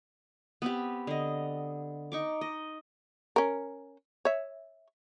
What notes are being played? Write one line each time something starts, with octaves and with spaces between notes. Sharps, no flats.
B3 C4 G4
D3 D#5
D#4 C#6 D6
D#5
C#4 A#4
C#5 E5